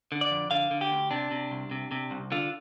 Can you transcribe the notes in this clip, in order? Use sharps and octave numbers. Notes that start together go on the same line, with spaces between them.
D3
D5
F2
D3 F5
D3
G4
D2
C3 D4
C3
C2
C3
C3
C2
D3 F4